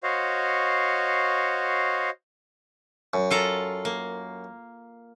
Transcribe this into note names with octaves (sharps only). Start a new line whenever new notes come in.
F#4 C5 C#5 D#5 F5
F#2
F4 A4 A#5
A#3